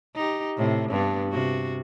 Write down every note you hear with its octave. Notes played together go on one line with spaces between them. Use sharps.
D#4 G4
A2 C3
G2 B3 D4
C3 F#4